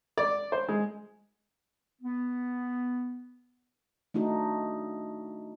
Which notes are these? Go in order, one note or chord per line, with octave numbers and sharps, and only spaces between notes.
D5
C5
G#3
B3
A3 D4 D#4 F#4